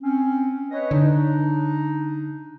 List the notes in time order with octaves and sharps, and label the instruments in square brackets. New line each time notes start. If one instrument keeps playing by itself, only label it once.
[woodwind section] C4 C#4
B4 C#5 D#5
[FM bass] D3 [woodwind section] D4 D#4